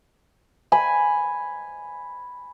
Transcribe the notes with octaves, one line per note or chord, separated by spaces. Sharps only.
G#5 B5